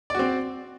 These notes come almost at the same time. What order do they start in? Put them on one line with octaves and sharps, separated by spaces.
D5 F#4 C4